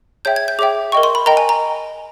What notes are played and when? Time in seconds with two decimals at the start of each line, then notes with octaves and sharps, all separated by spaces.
0.25 G#4 C#5 E5 G5 G6
0.36 G#6
0.48 G6
0.59 G#4 C#5 E5 G5 D6
0.92 A#4 D#5 G5 C#6
1.03 C6
1.15 B5
1.26 A#4 D#5 G5 A#5
1.37 G#5
1.49 A#5